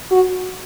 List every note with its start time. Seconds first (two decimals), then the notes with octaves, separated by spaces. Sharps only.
0.11 F#4